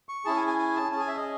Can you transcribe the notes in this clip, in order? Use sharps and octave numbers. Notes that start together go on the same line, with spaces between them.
C#6
C#4 E4 G#4 A5
G#5
G#5
G#5
A5
C#4 G#4 G#5 A5
E5
D#5